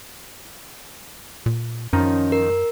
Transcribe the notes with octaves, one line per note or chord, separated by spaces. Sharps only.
A#2
F#2 D#3 F3 C#4 D#4
A#4